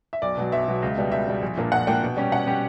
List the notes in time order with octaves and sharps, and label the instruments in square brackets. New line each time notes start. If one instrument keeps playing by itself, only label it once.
[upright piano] E5
[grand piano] B1 [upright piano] D5
[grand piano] B2 F#3
[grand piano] B1 [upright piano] E5
[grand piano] B2 F#3
C#2
B2 G3
[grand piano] C#2 [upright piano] E5
[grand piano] B2 G3
A#1
A#2 A#3 D4
[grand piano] A#1 [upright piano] F#5
[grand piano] A#2 A#3 D4 [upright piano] G5
[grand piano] B2
G3 C#4 G4
[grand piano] B2 [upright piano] F#5
[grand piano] G3 C#4 G4